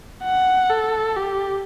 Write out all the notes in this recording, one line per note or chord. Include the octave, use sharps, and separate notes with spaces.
F#5
A4
G4